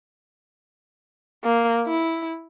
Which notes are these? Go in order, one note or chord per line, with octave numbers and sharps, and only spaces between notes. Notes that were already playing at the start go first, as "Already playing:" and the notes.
A#3
E4